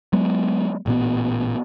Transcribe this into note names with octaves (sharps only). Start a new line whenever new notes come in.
F#3 G#3 B3
A1 A#2 B3